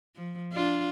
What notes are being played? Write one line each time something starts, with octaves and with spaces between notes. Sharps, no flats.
F3
D4 F4